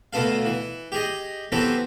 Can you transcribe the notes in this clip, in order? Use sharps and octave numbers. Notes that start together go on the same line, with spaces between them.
D2 B2 B3 A4 F5
E3
G4 G#4 D#5
E3 F#3 B3 C4 G4 A4